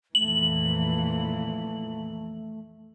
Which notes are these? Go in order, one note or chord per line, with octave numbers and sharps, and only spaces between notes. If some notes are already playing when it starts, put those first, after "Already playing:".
F2 A#2 E3 A3 F#7